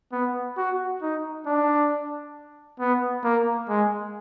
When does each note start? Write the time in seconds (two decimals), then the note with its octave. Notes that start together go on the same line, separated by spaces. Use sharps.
0.12 B3
0.57 F#4
1.02 D#4
1.46 D4
2.80 B3
3.24 A#3
3.69 G#3